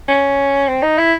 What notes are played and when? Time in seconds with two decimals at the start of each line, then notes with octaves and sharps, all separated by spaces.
0.08 C#4
0.68 C4
0.83 D#4
0.98 E4